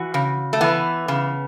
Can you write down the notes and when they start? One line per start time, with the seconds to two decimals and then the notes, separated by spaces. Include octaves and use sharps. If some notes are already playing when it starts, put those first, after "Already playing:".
Already playing: E3 F#4
0.14 C#3
0.53 A3
0.61 E3 B3
1.08 C#3